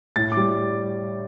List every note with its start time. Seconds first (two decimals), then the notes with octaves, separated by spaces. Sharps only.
0.16 A2 A6
0.32 D6
0.37 G3